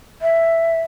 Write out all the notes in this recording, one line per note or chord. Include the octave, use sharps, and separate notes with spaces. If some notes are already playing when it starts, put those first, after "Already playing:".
E5